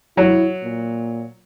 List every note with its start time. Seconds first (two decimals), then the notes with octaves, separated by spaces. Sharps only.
0.17 F#3 E4
0.63 A#2